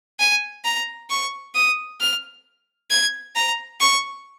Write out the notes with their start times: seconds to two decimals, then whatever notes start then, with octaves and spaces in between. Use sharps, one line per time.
0.19 G#5
0.64 A#5
1.10 C#6
1.55 D#6
2.00 F6
2.90 G#6
3.35 A#5
3.80 C#6